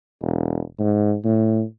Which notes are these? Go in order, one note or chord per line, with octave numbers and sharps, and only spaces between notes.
E1
G#2
A2